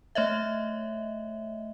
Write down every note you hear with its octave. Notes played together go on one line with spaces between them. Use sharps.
A3 C#5 D#5 E5